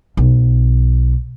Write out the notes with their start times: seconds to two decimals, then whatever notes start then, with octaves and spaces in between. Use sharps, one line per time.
0.17 B1